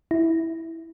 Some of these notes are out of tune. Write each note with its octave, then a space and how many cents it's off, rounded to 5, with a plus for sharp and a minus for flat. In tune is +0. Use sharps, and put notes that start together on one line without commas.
E4 -10